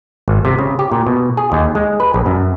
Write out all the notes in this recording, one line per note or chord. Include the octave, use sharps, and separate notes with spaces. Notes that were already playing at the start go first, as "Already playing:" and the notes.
G#1
C3
C#3
G4
A#2
B2
G#4
D#2
G#3
B4
A#1
F#2